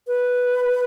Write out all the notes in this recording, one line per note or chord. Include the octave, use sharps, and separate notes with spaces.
B4